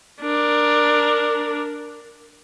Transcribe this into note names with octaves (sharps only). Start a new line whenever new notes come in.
D4 A#4